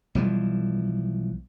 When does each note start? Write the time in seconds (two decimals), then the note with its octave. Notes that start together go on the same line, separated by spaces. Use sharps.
0.15 B1 E3 F3 G3